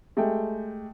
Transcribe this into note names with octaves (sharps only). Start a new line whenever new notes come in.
G#3 A3 G4 A4 G5